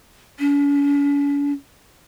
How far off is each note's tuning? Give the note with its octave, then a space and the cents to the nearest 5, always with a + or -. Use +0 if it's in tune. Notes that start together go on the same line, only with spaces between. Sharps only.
C#4 +45